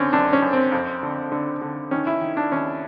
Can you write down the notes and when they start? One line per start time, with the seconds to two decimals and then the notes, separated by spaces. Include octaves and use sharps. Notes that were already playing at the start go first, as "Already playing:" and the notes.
Already playing: F#2 D3 C4 C#4
0.13 F#2 D4
0.33 C#4
0.42 F#2
0.53 C4
0.72 F2
1.03 D3
1.32 D3
1.61 D3
1.91 D#3 C#4
2.07 E4
2.21 D#3
2.37 D4
2.52 D#2 C#4